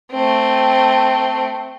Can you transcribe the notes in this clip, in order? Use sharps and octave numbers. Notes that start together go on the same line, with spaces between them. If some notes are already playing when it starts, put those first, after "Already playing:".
A3 C4